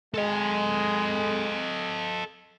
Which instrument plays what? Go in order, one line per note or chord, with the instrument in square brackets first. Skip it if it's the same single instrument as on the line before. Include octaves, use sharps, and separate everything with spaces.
[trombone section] G#3 [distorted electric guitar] A4 D#5